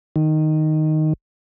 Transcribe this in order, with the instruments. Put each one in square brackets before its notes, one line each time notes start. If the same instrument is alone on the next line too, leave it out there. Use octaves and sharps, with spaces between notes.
[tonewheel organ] D#3